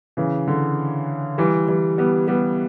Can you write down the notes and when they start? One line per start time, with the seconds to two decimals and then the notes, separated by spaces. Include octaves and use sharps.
0.17 C#3 E3
0.48 D3
1.38 E3 G3
1.68 E3 G3
1.98 G3 B3
2.28 G3 B3